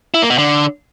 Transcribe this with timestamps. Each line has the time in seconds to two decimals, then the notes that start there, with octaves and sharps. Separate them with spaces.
0.14 E4
0.22 A#3
0.30 B2
0.38 D3